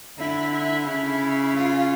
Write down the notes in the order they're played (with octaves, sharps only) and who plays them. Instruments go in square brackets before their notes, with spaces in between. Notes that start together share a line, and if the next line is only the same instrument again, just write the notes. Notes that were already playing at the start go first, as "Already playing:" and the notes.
[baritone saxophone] D3 [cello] E4
[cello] E4
[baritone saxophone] C#3 [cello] E4
[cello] F4